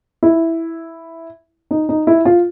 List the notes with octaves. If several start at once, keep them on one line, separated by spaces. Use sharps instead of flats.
E4
D#4
D#4
E4
F4